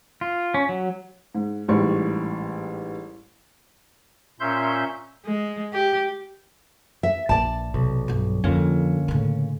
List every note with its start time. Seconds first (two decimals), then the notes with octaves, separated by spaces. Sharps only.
0.21 F4
0.54 C#4
0.69 F#3
1.35 G#2
1.68 A1 G#2 G3 D5 C#6
4.40 A#2 C#4 E5 C6 G6
5.25 G#3
5.73 G4
7.03 E5
7.29 A#1 D5 A5
7.74 B1 C3
8.08 G2 F#3
8.44 F2 D3 A#3 C#4
9.08 A2 C#3